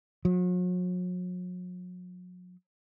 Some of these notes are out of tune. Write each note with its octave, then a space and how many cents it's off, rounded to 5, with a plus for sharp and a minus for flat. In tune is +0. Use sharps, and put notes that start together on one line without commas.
F#3 -40